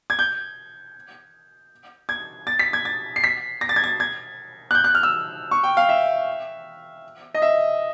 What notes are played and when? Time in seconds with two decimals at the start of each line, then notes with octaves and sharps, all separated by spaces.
0.10 G#6
0.19 G6
2.09 G#6
2.47 A6
2.59 B6
2.73 G#6
2.85 A6
3.16 C7
3.24 B6
3.61 A#6
3.69 A6
3.76 G#6
3.84 A6
4.00 G#6
4.71 F#6
4.75 G6
4.84 F#6
4.95 F6
5.03 E6
5.51 C#6
5.63 G5
5.77 F5
5.89 E5
7.35 D#5
7.42 E5